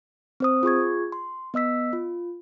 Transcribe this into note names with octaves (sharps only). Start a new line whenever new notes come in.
C4 C5 D#6
F4 G#4 C#6 G#6
C6
B3 D#5 E6 B6
F4